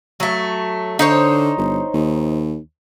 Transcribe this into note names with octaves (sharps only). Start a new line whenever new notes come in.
F#3 A3
D3 D#4 C5 C#5
G1
D#2